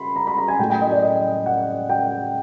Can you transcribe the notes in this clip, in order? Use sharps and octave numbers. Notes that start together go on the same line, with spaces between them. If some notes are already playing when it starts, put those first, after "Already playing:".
Already playing: B5 C6
A#5
B5
A#5
G#5
A2 F#3 A3 G5
G5
D#5
D5
D#5
F#5
G5